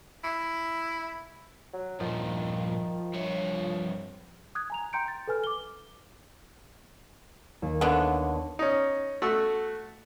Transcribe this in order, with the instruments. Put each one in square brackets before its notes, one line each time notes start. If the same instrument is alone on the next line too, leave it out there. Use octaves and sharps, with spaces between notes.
[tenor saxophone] E4
[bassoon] F#3
[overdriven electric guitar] G2 A#2 [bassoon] D#3 [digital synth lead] F3
[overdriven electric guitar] G2 C#5
[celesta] D#6 F#6 G#6
G#5 A#5 F7
G5 A#5 C6 G6 C#7 D7
A6
A4 B4 G#5 F6
D6 G7
[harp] D#2
[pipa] D3 B3 [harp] C#5 D#5
[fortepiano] C#4 D#4
A3 F#4 E6